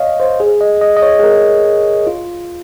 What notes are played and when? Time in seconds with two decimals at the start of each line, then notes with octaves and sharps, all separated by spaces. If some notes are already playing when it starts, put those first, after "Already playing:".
Already playing: C#5 D#5 F5
0.20 C5
0.40 G#4
0.61 D#5
0.81 D#5
0.97 D#5
1.02 C#5
1.19 G#4
1.23 A#4
2.07 F4